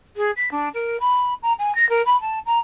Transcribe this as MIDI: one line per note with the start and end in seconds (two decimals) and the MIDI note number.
0.16 0.31 68
0.36 0.49 95
0.51 0.68 62
0.73 0.97 70
1.00 1.34 83
1.42 1.53 82
1.58 1.72 80
1.75 1.87 94
1.89 2.02 70
2.05 2.19 83
2.21 2.39 81
2.46 2.58 82